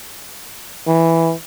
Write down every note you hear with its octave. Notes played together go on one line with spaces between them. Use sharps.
E3